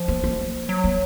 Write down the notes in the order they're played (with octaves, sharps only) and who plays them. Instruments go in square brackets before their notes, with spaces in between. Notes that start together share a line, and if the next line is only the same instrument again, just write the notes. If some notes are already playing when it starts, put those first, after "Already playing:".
Already playing: [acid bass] F3
[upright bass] A#3
A#3
[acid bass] F#3
[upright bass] A#3